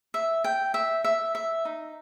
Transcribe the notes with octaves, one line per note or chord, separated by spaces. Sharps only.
E5
G5
E5
E5
E5
D#4